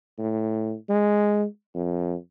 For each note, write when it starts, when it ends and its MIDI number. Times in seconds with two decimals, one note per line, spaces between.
0.18 0.75 45
0.90 1.45 56
1.75 2.15 41